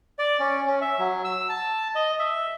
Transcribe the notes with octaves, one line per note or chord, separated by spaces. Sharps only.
D5
C#4
C#4
E5
F#3
E6
A5
D#5
E5